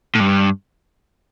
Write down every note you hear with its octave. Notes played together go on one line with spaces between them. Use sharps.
A2
G2